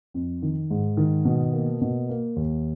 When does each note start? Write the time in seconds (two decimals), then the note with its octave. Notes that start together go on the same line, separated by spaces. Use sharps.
0.14 F2
0.42 D#3
0.71 G#2
0.97 D#3
1.25 B2
1.53 A#3
1.81 B2
2.09 A#3
2.36 D#2